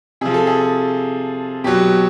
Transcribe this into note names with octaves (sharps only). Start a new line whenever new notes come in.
C3 F3 G#4
A4
G#4
B2 F#3 G4